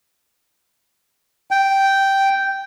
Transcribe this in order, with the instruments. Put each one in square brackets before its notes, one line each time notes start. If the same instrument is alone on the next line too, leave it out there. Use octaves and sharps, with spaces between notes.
[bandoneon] G5